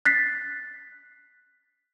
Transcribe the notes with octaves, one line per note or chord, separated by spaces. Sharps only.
F#6 A6 B6 C7